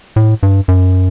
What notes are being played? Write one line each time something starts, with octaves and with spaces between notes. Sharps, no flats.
A2
G2
F#2